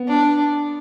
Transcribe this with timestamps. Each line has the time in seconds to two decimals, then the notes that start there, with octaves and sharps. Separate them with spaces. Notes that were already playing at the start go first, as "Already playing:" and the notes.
Already playing: B3
0.08 D4